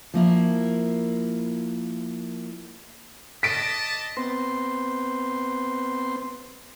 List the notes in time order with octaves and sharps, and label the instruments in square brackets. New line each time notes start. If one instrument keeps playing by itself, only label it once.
[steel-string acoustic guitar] F3 A#3 E4
[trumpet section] D5 D#5 A5 [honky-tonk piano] B6 D7
[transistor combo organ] B3 C4 C6